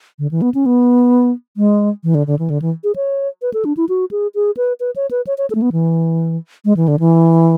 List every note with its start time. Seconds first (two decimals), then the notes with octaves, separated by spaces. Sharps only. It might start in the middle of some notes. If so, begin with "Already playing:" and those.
0.19 D3
0.31 E3
0.42 B3
0.54 C#4
0.66 B3
1.57 G#3
2.04 E3
2.15 D3
2.27 D3
2.39 E3
2.50 D3
2.62 E3
2.84 G#4
2.96 C#5
3.42 B4
3.54 A4
3.65 D4
3.77 E4
3.89 F#4
4.11 G#4
4.35 G#4
4.57 B4
4.80 B4
4.96 C#5
5.11 B4
5.27 C#5
5.38 C#5
5.50 A4
5.55 A3
5.62 B3
5.72 E3
6.65 G#3
6.77 E3
6.88 D3
6.99 E3